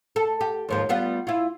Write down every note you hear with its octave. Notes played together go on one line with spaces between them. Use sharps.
A4
G4
D#2 G#2 F3
G3 B3 F4
E4 F4